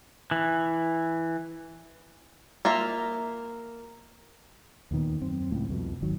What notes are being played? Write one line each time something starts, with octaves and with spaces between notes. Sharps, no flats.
E3
A#3 F4 E5 A#5
D#2 A#2 D#3 B3
F#2 C4
C#2 A2
C2 F2 B2
G#1 D#3 F#3